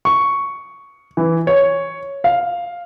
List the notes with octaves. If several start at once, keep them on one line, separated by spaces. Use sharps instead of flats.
C#6
E3
C#5
F5